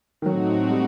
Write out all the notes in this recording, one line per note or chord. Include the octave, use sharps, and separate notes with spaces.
D#3
A2 F#3 A3 C4 D#4 F#4
G3